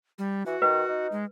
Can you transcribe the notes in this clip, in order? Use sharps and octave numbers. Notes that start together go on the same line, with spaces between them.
G3
E3 F#4
D#3 B4
D#4
G#3